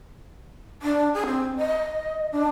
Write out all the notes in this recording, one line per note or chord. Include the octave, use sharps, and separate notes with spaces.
D4
G#4
C4
D#5
D4